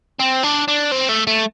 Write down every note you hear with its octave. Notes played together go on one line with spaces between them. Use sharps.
C4
D4
D4
C4
A3
A3